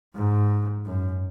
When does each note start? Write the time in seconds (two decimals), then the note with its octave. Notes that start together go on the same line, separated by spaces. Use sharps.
0.15 G#2
0.86 F#2